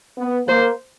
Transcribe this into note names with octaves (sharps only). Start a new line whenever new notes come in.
B3
A#3 C5